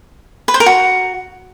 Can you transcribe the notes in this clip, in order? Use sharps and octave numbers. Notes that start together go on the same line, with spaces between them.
B4
C5
A#4
F#4